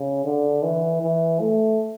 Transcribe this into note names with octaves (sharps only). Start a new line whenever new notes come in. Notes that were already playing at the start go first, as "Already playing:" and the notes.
Already playing: C#3
D3
E3
E3
A3